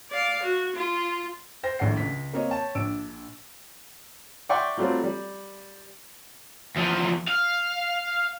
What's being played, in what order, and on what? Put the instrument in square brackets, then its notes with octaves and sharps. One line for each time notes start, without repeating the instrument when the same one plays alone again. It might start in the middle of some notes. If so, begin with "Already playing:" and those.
[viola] D5 F5
F#4
F4
[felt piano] C5 G5 A#6
D#1 A#1 A2 F#5 C7
C#2 B6
A#3 C4 C#5 D#5
C#5 G5 A5
A#1 D4 E6 D7
[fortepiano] D5 E5 F#5 G5 C6 C#6
F#3 G3 A3 C4 F4
G3
[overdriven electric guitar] E2 F3
F5